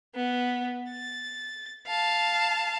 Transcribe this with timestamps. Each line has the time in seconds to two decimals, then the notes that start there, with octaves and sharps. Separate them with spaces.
0.15 B3
0.91 A6
1.87 F5 A5